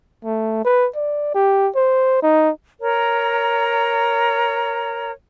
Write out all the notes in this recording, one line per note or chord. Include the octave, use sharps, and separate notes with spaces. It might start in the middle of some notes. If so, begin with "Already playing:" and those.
A3
B4
D5
G4
C5
D#4
A#4 C#5 A#5